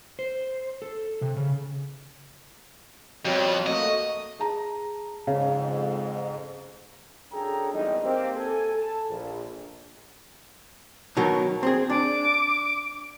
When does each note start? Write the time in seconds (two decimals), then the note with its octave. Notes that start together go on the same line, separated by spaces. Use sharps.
0.19 C5
0.82 A4
1.21 C3
1.36 C#3
3.25 F2 F#3 G3
3.66 A3 A#3 F#4 D#5
4.39 G#4 A5 A#5
5.27 F2 G#2 C#3 F5
7.32 F#2 D4 G#4 A4 G5 A#5
7.73 G#1 E2 G3 D#4 D#5
8.03 A#3 C4 G4
8.36 A4 G#5
8.75 A4 A5
9.09 A#1
11.17 B2 D#3 F#3
11.63 C4 G#4
11.90 D4 D6